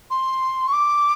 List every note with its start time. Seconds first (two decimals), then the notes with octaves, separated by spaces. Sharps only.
0.10 C6
0.68 C#6
0.73 D6